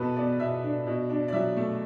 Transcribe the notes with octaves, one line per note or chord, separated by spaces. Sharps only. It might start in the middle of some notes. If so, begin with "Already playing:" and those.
Already playing: B2 B3 A4 B4
B3 D5
B2 E5
D4
B2
D4
D5
F#3 E5
A3